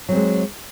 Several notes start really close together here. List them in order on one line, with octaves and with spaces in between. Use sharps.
F#3 C4 G#3